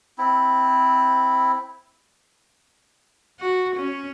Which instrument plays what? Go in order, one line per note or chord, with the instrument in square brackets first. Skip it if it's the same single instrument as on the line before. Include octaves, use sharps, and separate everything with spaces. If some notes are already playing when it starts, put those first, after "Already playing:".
[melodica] C4 E4
[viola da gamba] F#4
C#4